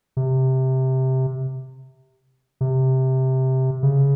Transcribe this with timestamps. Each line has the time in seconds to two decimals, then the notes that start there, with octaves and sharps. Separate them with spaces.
0.17 C3
2.61 C3
3.83 C#3